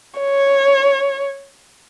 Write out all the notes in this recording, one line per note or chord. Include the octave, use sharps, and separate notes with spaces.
C#5